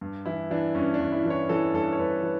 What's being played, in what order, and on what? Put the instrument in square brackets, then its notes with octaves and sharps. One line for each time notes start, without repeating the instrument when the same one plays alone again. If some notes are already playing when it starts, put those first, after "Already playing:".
[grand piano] G2
E3 E4
E3 D4
G2 C#4
D4
G2
E4
E3
C#5
E3 A4
G2 A4
C#5
G2 B4
E3 B4